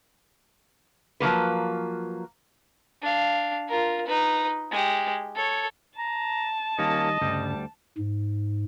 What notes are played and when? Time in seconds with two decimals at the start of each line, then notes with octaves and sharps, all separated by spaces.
1.20 F3 F#3 A#3 B4
3.02 D4 F5
3.68 F4 A#4
4.06 D#4 B4
4.71 G#3 G4
5.35 A4 C#5
5.98 A5 A#5
6.78 D#3 G3 A#3 C#4 D#5
7.21 D2 G2 C#3 G3
7.98 G#2